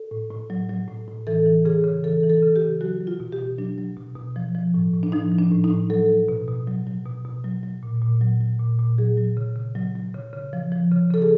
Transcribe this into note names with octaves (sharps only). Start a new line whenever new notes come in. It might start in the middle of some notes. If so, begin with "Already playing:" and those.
Already playing: A4
A2
A2
F#3
F#3
A2
A2
E3 A4
E3
C#3 G#4
C#3
E3 A4
E3
A4
C#3
G4
C#3
F#3 F#4
F#3
F4
B2
G4
B2
F#3 D4
F#3
B2
B2
F3
F3
A2
A2
D4
F3 D#4
F3
D4
A2
D#4
A2
F#3 A4
F#3
B2
B2
F#3
F#3
B2
B2
F#3
F#3
A#2
A#2
F#3
F#3
A#2
A#2
F#3 G#4
F#3
C#3
C#3
F#3
F#3
C#3
C#3
F3
F3
C#3
C#3 A4
G#4